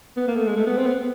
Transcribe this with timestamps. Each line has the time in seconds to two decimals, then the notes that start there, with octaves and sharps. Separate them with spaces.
0.17 B3
0.28 A#3
0.36 A3
0.47 G#3
0.57 A3
0.67 B3
0.77 C4
0.86 B3